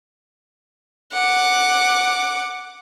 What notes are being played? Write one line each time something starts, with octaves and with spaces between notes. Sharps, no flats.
F#5 D6